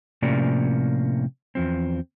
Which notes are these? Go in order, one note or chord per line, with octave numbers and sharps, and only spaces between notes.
A2 C3 F3 A#3 C#4 D5
E2 F3 C4